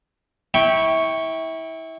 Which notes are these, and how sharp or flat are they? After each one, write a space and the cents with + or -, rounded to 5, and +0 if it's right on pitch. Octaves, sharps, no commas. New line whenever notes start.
E4 -25 G5 +0 C#6 +0